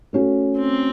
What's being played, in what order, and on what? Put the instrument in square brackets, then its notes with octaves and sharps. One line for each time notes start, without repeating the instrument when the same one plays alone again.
[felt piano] A3 C#4 F#4
[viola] C4